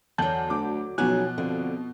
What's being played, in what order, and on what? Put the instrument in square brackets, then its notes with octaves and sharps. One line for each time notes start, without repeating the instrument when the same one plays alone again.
[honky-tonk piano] E2 G6 F#7 [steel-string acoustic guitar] D3 F#3 [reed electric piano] A5
[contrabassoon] D2 [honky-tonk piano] D6
[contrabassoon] B1 [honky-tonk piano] B2 F3 [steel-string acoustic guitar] F#3 C#4 G#5 [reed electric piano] F#6
[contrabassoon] F2 [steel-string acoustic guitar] D3